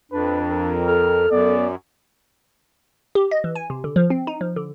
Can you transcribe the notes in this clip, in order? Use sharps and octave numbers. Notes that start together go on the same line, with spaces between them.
F2 D4 B4
A#4
A4 F6
F#2 B3 D5
G4
D#5
E3
G#5
C3
D3
F3
C4
D#4
F3
D3